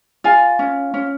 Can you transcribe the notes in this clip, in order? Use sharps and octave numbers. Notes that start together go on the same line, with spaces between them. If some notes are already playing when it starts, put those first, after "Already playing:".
F4 F5 G#5
C#4
C#4